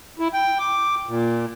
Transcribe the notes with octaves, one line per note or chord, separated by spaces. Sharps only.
E4
G5
D6
A#2